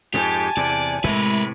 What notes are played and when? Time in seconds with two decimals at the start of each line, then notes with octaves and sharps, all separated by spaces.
0.14 F2 G#2 G4 G#5 A5
0.57 E2 C3 D5
1.04 A2 C3 G#3 E4 A#4 B4